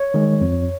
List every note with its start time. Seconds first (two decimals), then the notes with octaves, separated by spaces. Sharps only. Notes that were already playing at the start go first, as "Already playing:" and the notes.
Already playing: C#5
0.14 D#3 G#3
0.41 F2